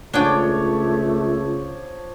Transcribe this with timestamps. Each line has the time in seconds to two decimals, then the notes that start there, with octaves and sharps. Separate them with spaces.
0.13 C#2 F3 A3 D4 G#4 C#5 G5 D6